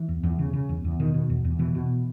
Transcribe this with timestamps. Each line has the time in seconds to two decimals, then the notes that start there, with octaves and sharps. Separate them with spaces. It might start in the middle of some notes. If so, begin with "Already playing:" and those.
Already playing: E3
0.08 E2
0.23 E2
0.39 C#3
0.53 C#3
0.69 E2
0.84 E2
1.00 B2 D#3
1.14 B2
1.29 E2
1.44 E2
1.59 B2 E3
1.75 B2